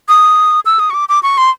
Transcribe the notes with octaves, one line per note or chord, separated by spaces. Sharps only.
D#6
E6
D#6
C#6
D6
D6
C#6
C6